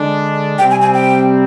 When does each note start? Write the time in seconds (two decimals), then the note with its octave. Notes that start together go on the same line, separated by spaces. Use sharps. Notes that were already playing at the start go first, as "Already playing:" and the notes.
Already playing: D3 G#3 D4
0.58 C3 G3 C4 G5
0.71 G#5
0.81 G#5
0.94 G5